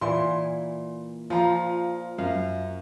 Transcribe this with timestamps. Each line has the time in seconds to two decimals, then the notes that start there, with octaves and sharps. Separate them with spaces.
0.01 A#2 E3 C6
1.30 F3 F4 A#5
2.18 F#2 F5